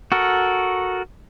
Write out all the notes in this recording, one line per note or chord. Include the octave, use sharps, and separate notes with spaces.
F#4 A4 A#4